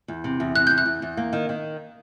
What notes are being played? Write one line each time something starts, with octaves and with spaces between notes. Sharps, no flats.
E2
C3
E2
C3 F#6
E2 G6
F#6
E2
E2
A#3
D#3
D#3